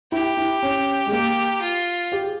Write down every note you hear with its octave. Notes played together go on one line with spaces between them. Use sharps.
E4 G4
E4
C#4
G#3
A#3 G4
F4
G4
G#4